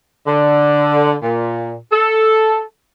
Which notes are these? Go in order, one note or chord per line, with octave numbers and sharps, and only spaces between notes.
D3
A#2
A4